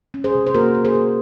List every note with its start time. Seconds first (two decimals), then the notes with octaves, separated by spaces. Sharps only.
0.14 C#4
0.24 G#4 C5
0.35 C3
0.46 C5
0.54 A#3 F#4 A#4
0.75 A#3
0.85 G#4 C5
0.95 A#3